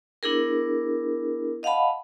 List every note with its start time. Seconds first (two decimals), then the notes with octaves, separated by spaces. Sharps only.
0.23 B3 D4 E4 G#4 A#4
1.63 D#5 F5 F#5 A5 B5